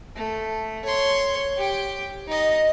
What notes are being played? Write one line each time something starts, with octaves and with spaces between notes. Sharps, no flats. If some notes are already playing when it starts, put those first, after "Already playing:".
A3
C#5 C6
G4 G5
D#4 D#5